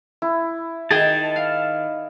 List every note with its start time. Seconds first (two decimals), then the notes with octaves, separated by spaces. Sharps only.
0.22 E4
0.91 D#3 G#4 G5 A5
1.36 F5